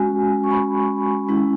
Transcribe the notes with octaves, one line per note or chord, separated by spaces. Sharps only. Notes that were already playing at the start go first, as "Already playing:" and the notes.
Already playing: G#3 C#4 F#4 G#5
C#6
B5
G#3 C#4 E4